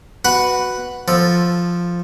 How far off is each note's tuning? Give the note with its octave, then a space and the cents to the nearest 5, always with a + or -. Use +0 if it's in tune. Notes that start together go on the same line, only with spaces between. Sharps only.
F#4 +0 B4 +0 F#5 +0
F3 +0 A4 +0